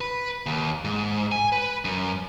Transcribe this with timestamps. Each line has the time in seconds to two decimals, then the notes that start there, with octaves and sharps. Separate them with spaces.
0.01 B4
0.46 D#2
0.84 G#2
1.32 G#5
1.52 B4
1.85 F#2